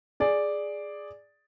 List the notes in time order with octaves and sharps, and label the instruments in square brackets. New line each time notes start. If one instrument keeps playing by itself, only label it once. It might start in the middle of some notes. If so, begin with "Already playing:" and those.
[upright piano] G#4 D5